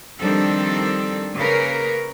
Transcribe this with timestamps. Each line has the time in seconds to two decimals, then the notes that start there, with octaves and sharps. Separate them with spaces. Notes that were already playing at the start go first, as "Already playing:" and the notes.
0.21 D#3 F3 G3 C4 D4 A4
1.37 C#3 A#3 C#4 A#4 B4